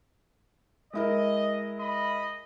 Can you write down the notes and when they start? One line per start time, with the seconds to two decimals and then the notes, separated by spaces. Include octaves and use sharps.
0.93 G#3 E4 A#4 D#5
1.80 D#5 B5